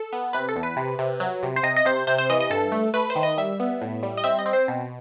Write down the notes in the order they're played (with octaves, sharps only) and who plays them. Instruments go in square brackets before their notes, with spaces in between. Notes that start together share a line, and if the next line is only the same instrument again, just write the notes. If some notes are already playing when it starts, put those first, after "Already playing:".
Already playing: [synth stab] A4
B3
C3 B4
A4
E2
B4
C3
C3
F#3
C3
C5
C3 D#5
D#5
C3 C5
C3 C5
C5
E3 D#5
D#5
G2 A4
A3
A3 B4
C5
D#3
D#5
G3 E5
B3
A2
G3
D#5
C4 E5
D#5
C4
C5
B2